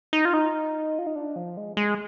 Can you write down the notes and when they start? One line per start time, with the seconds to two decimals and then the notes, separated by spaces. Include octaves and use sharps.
0.13 D#4
0.25 F4
0.33 D#4
0.99 F4
1.07 D#4
1.16 D4
1.36 F3
1.57 G#3
1.77 G#3